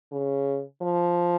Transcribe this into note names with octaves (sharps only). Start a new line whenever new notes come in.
C#3
F3